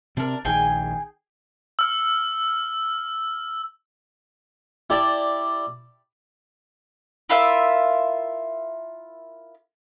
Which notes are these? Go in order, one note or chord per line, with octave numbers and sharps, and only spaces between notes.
C3 C4 D4 A#4
A#1 D#3 G#4 G5 G#5
E6 F6
E4 G4 D5 A5
E4 F4 A#4 E5